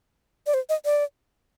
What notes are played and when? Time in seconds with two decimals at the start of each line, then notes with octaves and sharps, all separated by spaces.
0.47 D5
0.54 C5
0.69 D#5
0.85 D5